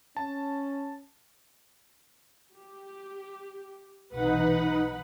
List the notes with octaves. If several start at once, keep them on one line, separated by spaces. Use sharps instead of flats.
C#4 A5
G4
B1 C3 E3 D#4 B4 F#5 B5